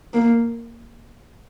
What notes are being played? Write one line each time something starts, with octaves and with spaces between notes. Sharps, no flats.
A#3